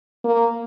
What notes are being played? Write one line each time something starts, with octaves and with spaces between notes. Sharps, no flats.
A#3